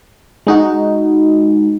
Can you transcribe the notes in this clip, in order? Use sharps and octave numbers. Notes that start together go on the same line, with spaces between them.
G#3 D#4 F#4